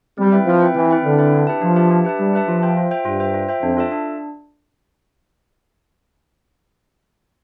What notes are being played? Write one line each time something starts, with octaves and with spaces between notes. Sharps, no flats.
G3 C4
E4 B4 E5 G5
F3 C4
E4 B4 E5 G5
E3 C4
E4 B4 E5 G5
D3 C4
E4 B4 E5 G5
D4
G4 B4 E5 A5
F3 D4
G4 B4 E5 A5
D4
G4 B4 E5 A5
G3 D4
G4 B4 E5 A5
F3 F4
C5 E5 G5
F4
C5 E5 G5
G2 F4
C5 E5 G5
F4
C5 E5 G5
F2 D4
F4 A4 E5 A5
D4